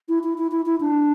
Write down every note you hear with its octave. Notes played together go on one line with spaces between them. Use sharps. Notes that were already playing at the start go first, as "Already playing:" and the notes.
E4
E4
E4
E4
E4
D4